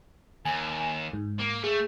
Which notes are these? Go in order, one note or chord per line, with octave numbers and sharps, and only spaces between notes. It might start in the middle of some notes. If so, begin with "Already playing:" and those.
D#2 G#5
G#2
A#3
A3 G#4